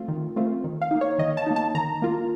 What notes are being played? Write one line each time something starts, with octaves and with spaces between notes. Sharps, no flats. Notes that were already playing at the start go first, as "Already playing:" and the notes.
Already playing: A3 C4 F4
D#3
A3 C4 F4
D#3
F5
A#3 D#4
C#5
D#3 D#5
A5
A#3 D#4
A5
D#3 A#5
A#3 F4